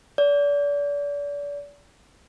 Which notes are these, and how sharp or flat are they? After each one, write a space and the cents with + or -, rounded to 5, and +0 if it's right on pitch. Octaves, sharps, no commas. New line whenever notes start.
D5 -35